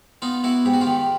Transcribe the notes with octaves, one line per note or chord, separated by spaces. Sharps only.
B3 D#4 F4
B3 E4 F#4
G#2 G4
F#4
F4 G4
D#3